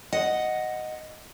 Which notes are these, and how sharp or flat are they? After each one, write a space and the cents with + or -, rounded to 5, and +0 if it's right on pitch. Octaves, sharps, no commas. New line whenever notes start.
D#5 +0 F#5 +0